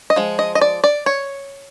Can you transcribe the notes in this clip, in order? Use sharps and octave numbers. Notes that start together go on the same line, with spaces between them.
D#5
F3 G#3
D#5
D#5
D5
D5
C#5